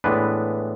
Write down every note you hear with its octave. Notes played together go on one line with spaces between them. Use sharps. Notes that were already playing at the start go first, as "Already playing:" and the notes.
A2 E3 G#3 B3 D4 B4